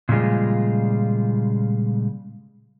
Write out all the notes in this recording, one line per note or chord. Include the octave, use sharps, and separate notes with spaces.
A#2 C#3 F3 G3 G#3 F4